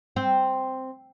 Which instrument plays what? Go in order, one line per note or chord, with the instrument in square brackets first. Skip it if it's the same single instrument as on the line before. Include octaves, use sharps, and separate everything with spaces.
[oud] C4